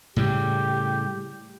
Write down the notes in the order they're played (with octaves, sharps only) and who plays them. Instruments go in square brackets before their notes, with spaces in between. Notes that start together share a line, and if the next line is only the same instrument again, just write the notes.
[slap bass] A2 C#3 G3 [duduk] G4